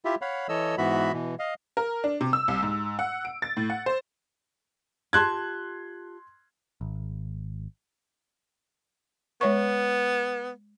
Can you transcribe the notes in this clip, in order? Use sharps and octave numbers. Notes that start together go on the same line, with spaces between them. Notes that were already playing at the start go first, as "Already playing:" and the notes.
E4 F4 G4 E5
C#5 F5 F#5 B5
E3 A4 C#5 D#5 E6
G#2 E3 B3 F#4 E5 B5
B2 E3
D#5 F5
A#4
D4
C3
E6
C2
G#2
F#5
D7
A6
A2
F#5
C5
F4 G4 A5 C6 F#6 G#6
G#1
G#3 B3 C#5 C#6